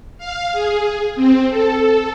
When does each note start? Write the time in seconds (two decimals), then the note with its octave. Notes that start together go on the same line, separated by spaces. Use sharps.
0.18 F5
0.53 G#4
1.16 C4
1.50 A4